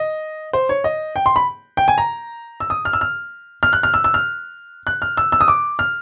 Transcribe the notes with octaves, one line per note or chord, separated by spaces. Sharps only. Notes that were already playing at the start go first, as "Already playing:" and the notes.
Already playing: D#5
C5
C#5
D#5
G5
C6
B5
G5
G#5
A#5
E6
D#6
F6
E6
F6
F6
F#6
F6
E6
E6
F6
F#6
F6
E6
E6
D#6
D6
F6